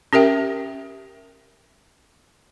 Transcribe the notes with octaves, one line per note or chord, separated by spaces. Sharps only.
C#4 G4 A#4 E5 G5